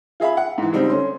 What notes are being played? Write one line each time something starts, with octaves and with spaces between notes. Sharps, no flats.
F4 G#4 E5 F5 B5
F#5
G#2 E3
C#2 G3 C4 D#4
D3 C#4 C6